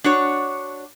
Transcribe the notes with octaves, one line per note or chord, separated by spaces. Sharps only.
D4 F#4 C#5